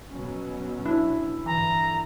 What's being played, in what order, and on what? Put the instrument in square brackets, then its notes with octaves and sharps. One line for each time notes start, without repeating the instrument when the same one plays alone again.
[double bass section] B2 F#3 C#4
[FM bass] D4 [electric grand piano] E4
[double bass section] G2 D3 [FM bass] E3 [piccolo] A#5